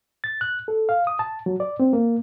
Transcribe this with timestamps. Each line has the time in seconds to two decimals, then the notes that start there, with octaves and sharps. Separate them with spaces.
0.24 A6
0.41 F#6
0.68 A4
0.89 F5
1.07 D#6
1.19 A5
1.46 F#3
1.60 D5
1.80 C4
1.93 A#3